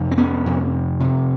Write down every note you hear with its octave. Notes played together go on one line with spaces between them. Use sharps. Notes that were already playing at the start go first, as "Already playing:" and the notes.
Already playing: F2 C3
C4
B3 C#4
F2 C3
F2 C3